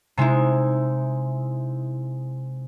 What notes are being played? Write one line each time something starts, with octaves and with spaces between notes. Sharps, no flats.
C3 G#3 D#4 E4